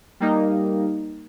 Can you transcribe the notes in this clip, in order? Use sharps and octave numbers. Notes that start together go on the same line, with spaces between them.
G3 A#3 D#4